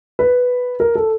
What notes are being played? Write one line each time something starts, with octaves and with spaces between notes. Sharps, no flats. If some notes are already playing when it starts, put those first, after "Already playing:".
B4
A#4
A4